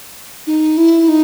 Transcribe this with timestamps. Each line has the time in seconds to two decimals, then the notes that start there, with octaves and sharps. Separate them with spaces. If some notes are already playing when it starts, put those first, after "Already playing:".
0.47 D#4
0.77 E4
1.08 D#4